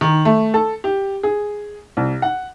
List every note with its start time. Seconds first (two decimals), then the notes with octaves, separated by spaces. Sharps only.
0.01 D#3
0.25 A3
0.54 A4
0.84 G4
1.23 G#4
1.97 C2
2.22 F#5